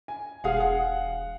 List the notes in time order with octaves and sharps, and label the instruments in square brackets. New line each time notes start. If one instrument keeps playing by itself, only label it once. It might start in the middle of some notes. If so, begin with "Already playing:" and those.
[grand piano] G#5
[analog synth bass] E1 [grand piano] G#4 F5 F#5
[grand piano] F5 F#5